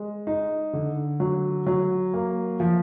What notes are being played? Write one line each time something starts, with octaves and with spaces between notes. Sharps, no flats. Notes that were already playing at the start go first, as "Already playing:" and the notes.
Already playing: G#3
D#4
D3
F#3
F#3
A#3
F3